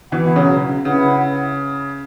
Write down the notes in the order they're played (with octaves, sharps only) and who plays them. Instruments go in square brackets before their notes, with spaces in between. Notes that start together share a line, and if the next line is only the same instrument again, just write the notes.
[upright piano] B2 E3 [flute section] E4 B4 F#5
[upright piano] C#3 F#3
[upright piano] C#3 [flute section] E4 B4 F#5